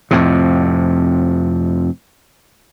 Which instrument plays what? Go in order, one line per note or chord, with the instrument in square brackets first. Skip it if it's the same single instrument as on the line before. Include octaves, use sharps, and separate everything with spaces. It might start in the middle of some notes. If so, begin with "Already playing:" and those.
[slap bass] F2 A2 C3